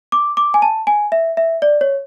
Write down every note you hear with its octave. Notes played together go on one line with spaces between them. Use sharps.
D6
D6
G#5
A5
G#5
E5
E5
D5
C#5